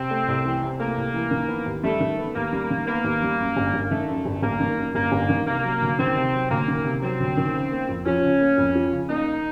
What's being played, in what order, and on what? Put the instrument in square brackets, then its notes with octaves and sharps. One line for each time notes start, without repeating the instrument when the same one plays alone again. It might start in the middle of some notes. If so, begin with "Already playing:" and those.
Already playing: [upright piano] C3 [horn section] C4
[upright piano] A3
C2
E3
C3
[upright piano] A3 [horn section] A#3
[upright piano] C2
E3
D#3
B3
D#2
[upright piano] G3 [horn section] A3
[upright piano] D#3
B3
[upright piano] D#2 [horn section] A#3
[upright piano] G3
D#3
[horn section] A#3 [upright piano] B3
[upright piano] D#2
G3
F#2
G1
G1
[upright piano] D#3 [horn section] A3
[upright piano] F#2
G1
[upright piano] G1 [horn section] A#3
[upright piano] D#3
F#2
[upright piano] G1 [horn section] A#3
[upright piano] G1
D#3
[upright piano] C3 [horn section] A#3
[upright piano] F#3
D2
[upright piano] D#3 [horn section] C4
[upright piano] C3
F#3
[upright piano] D2 [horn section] A#3
[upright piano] D#3
C3
[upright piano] F#3 [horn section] C4
[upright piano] D2
D#3
C#3
A#3
F2
[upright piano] F3 [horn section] C#4
[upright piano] C#3
A#3
F2
F3
C#3
[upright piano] A#3 [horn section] D#4